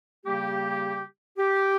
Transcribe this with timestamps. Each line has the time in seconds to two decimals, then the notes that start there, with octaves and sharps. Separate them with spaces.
0.25 C#3 G3 A#3 G4
1.38 G4